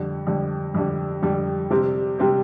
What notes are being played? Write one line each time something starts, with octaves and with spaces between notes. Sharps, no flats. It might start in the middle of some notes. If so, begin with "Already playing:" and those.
Already playing: F2 D3 G3
F2 D3 G3
F2 D3 G3
F2 D3 G3
C3 G3 C4 G4
C3 G3 C4 G4